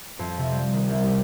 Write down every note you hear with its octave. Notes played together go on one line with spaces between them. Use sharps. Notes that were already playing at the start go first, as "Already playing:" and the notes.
F2
C3
G3
D#3
C2
G4